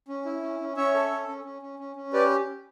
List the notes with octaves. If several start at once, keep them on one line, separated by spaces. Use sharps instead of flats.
C#4
E4
C#4
C#4
C#4 C#5 E5
A4
C#4
C#4
C#4
C#4
C#4
C#4
G4 B4 D5